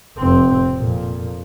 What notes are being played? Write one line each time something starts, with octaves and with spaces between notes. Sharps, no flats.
F1 C4
F2 A#2